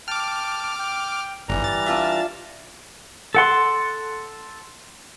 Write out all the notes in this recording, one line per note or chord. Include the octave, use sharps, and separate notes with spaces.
G5 A5 D6 F6
G5
G1 E3 G3 A#5
A6
D4 F4 E5
A4 F#5 C6